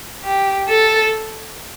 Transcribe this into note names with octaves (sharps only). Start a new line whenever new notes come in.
G4
A4